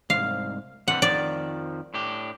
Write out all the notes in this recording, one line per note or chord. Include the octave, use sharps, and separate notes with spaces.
C2 G#2 F5
C3 E3 G3 F#5
F2 D#3 F3 D5
A2 D4 G4